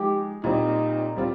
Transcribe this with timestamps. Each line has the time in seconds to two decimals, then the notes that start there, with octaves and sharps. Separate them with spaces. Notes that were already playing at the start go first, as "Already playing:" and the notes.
Already playing: F3 G#3 D#4 G4
0.44 A#2 G3 C4 D#4
1.16 G3 C4 F4